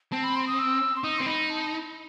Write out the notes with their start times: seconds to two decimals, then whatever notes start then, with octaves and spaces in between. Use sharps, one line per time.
0.12 C4 A5
0.23 B5
0.35 C6
0.47 D#6
0.59 E6
0.96 C6
1.04 D#4 D#6
1.18 C4 C6
1.26 D#4 B5
1.50 A5